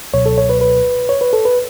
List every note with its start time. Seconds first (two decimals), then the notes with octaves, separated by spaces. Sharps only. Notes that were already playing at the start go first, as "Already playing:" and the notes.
0.13 C#2 B2 F#3 C#5
0.26 A4
0.38 C#5
0.49 B4
0.61 B4
1.09 C#5
1.21 B4
1.33 A4
1.45 B4